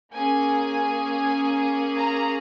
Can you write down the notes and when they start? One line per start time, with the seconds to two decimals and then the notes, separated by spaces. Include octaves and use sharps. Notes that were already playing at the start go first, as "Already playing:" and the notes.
0.13 A#3 C#4 G#4 G#5
1.97 A#5